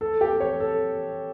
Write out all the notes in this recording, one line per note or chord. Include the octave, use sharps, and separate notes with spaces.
A4
G4
C#5
A4